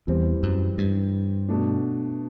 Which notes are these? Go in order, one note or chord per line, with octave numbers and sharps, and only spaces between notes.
E2 E3 G3 C4
F#2
G2
B2 A3 D4